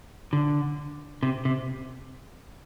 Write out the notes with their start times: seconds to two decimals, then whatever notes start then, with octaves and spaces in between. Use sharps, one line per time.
0.33 D3
1.23 C3
1.45 C3